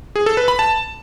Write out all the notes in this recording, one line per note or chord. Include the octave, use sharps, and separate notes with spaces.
G#4
A4
B4
B5
A5